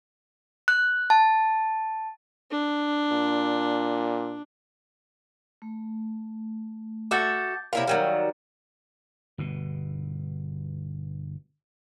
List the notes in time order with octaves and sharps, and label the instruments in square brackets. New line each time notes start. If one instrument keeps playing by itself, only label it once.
[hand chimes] F#6
A5
[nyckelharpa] D4
[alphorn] A#2
[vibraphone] A3
[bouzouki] F#4 A4 E5 [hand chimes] D6 G6 A6
[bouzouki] C3 E4 A#4 [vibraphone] C#5 D5 F#5 [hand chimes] F5
[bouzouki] D#3 F#3 G3 [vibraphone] A#4 F#5
[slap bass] G1 B2